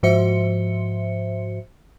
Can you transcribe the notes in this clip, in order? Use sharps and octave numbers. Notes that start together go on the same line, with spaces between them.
G#2 F3 F#4 C5 E5 C#7